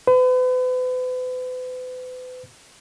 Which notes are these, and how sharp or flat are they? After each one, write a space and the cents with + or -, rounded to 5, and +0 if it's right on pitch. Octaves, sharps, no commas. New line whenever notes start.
B4 +40